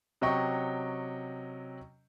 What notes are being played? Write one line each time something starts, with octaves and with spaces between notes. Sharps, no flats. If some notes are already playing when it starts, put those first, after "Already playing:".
C3 F#3 C#4 D#5 G5 C#6